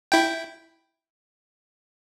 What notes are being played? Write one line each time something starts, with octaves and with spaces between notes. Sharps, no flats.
E4 G5